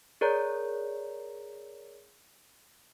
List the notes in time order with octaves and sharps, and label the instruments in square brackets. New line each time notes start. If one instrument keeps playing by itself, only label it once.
[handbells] G#4 A#4 C#5 D5 A#5 G6